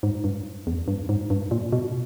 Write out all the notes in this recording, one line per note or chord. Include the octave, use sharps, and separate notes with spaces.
G#2
G2
E2
G2
G#2
G2
A#2
B2